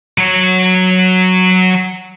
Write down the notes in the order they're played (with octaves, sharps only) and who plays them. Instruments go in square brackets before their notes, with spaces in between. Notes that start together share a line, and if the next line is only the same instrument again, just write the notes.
[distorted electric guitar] F#3 C#5